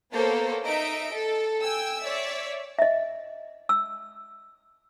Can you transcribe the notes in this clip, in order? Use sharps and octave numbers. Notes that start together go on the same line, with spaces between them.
A#3 B3 A4 C5 C#5
D#4 D#5 E5 D7
A4
G5 G#5 E6
C#5 D5 E5
D#5 E5
E6